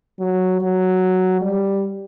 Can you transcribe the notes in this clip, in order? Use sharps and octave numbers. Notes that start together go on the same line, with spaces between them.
F#3
F#3
G3